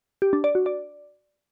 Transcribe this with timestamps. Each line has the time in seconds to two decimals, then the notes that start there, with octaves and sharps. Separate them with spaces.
0.22 G4
0.33 D4
0.44 D5
0.55 F#4
0.66 D5